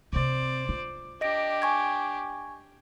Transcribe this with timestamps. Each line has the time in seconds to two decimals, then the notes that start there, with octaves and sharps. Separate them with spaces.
0.13 C3 C4 C5 D5
0.69 F4
1.21 D4 G4 D#5 A#6 D7
1.62 G#5 C#6 G#6